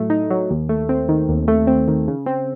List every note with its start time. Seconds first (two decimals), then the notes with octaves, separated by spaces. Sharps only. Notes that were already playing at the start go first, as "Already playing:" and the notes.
Already playing: A2 F#3 A3
0.10 D#4
0.30 F#3
0.50 D#2
0.69 A3
0.89 C4
1.09 D#3
1.29 D#2
1.48 A3
1.67 C4
1.88 D#3
2.08 C#3
2.26 C4